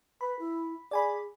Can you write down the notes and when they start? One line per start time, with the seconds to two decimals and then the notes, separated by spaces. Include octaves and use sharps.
0.21 B4 B5
0.39 E4
0.91 G#4 D5 G#5 B5